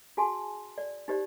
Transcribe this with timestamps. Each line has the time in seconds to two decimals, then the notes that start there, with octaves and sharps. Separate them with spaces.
0.17 F#4 G#4 G#5 A5 C6
0.78 D5
1.08 D#4 G4 C5 D5